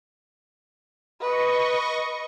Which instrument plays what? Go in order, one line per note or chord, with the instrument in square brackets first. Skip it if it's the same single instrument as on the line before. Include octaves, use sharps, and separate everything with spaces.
[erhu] B4 [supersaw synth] D#5 C#6